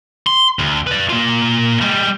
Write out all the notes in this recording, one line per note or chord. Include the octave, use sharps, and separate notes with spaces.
C6
D2
B4 D5
A#3 F4
G3 G#3